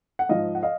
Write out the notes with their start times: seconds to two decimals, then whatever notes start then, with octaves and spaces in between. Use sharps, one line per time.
0.19 F#5
0.29 G#2 F3 D#5 F5
0.55 F#5
0.63 D#5 F5